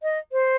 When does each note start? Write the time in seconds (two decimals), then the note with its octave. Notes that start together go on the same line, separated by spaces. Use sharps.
0.03 D#5
0.32 C5